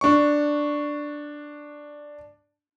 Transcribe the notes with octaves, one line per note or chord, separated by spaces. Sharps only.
D4 C#6